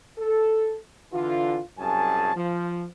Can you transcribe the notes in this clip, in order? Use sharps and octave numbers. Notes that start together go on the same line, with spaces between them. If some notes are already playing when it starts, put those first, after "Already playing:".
A4
D3 E3 F4
C2 F#2 G#4 G#5 A5
F3